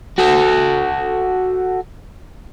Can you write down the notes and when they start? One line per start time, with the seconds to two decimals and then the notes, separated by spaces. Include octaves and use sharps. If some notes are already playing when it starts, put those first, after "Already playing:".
0.18 F#4 A4